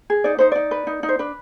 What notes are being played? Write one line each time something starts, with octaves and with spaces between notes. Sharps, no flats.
G#4
D#4 D5
D#4 C5
D#4 D5
B4
D#4
D#4
C5
D4 B4